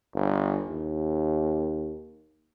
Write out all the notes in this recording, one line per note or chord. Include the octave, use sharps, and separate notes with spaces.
G1
D#2